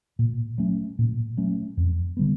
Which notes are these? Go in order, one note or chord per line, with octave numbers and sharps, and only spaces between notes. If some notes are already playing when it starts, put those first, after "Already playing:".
A#2
F#3 A3 C#4
A#2
F#3 A3 C#4
F2
D3 G3 B3